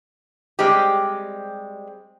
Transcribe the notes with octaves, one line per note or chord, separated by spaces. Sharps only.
G3 G#3 C4 G4